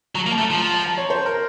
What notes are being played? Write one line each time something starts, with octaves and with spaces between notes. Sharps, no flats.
F#3 A#5
A#3
A5
A3
F3 A5
A#5
A5
A5
C#5
C5
A#4